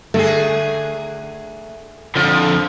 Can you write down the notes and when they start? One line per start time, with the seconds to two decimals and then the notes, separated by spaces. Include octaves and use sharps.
0.14 D3 A3 G#4
2.15 F2 D3 F3